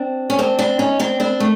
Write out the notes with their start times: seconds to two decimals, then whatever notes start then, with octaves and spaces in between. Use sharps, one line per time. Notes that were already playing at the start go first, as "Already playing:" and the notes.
Already playing: C4 D4
0.30 C#4
0.39 C4 D4
0.59 C4 D4
0.79 C#4 D#4
1.00 C4 D4
1.20 C4 D4
1.40 A3